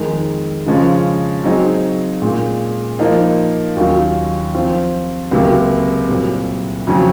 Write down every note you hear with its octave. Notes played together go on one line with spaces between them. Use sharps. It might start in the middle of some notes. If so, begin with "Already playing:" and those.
Already playing: F2 D#3 G#3 D#4 A#4
C#3 F3 G#3 C#4
F#3 C4 D#4 G#4
A#2 G#3 C#4
F3 A#3 D#4
D#2 D#3 F#3 C#4 F4
F3 C4 F4
C#2 C3 F#3 A#3
C2 A#2 F#3 C4
F2 C#3 F#3 C#4 F#4